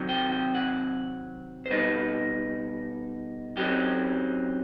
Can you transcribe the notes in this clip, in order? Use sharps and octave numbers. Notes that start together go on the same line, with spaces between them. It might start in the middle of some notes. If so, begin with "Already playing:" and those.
Already playing: C3 D#3 F#3 C4
G5
G5
F#5
C5
B2 G3 D#4 B4
F#2 F#3 C4 D#4 G4